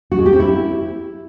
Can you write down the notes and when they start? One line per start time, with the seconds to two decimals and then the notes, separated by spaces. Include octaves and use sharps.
0.12 F#4
0.19 G#3
0.26 G4
0.33 C4
0.40 E4